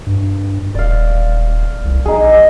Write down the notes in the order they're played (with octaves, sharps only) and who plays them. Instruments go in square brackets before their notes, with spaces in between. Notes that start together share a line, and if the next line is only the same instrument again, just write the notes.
[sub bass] G2
[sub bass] D#1 [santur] D5 F5
[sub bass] C2
[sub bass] A#1 [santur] D#4 G#4